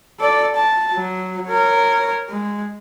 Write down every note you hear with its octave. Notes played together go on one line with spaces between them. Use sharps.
A4 D5
A5
F#3
A#4 C#5
G#3